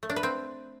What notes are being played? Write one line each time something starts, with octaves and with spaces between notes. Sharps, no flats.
A3
D4
B4
C4